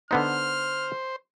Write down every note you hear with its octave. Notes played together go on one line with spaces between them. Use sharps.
D3 B3 D#4 C5 F6